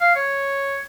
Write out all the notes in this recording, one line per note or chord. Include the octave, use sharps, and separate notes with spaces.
F5
C#5